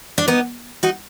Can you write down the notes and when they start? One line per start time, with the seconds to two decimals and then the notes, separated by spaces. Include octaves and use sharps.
0.18 D4
0.28 B3 D#4
0.83 D#4 F#4